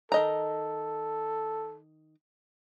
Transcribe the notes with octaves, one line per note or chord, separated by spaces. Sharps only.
D#3 A4 D#5 A#5